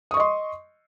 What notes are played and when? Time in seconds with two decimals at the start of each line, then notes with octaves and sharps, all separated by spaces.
0.11 D#6
0.14 C#6
0.17 D#5
0.20 C6